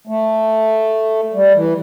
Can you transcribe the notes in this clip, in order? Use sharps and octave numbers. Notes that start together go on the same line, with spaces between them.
A3
G3
E3